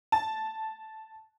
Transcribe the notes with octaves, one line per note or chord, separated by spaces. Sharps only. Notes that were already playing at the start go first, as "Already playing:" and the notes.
A5